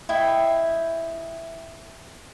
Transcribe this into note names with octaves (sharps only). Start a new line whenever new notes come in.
E4 D#5 E5 G5